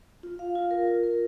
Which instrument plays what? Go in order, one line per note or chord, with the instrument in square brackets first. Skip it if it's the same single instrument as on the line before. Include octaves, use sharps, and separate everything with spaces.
[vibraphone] F4
F5
F4
A#4
F4
A#4